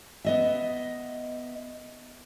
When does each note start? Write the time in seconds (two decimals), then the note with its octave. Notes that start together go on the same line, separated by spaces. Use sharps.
0.25 B3 D#5 E5